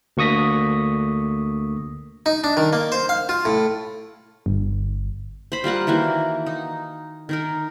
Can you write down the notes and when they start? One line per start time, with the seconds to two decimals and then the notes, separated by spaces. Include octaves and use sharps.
0.17 D2 A#3 C#6 D#6 A#6 B6
2.26 D#4
2.44 D4
2.57 D#3
2.73 A#3
2.92 C5
3.09 F5
3.29 F4
3.45 A2
4.46 G1
5.52 C5 B5
5.64 G3 F4 A#4 F#5
5.87 D#3 E3 A#3 F#4
6.46 D#4
7.29 D#3 D#4 A#4